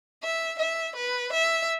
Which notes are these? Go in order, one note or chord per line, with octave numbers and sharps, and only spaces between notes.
E5
E5
B4
E5